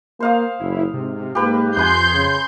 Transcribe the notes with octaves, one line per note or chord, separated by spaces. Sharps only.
A#3 C5 F5 D#6
F#1 E4
G#2 C3
G#2 A#3 G4 B4
F2 G#5 B5 C6 D#6 G6
C#3